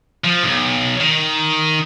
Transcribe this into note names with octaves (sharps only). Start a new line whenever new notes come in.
F3
B1 G#2
D#3